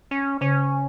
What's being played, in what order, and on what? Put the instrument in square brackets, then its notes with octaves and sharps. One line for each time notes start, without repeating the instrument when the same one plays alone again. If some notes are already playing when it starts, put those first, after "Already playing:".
[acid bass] C#4
[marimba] C#3 [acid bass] C#4